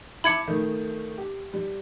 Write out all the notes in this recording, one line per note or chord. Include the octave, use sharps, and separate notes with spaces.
E4 A5 B5 D6 G#6 C#7
D#3 A3
G4
G3